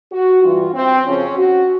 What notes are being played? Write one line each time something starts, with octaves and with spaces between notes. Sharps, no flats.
F#4
G2 E3 F4
C4
F2 C#3 F3 C#4
F#4